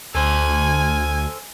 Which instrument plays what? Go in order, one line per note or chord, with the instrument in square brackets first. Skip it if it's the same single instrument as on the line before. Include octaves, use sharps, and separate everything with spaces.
[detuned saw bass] D2 [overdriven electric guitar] A4 C5 [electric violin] G#5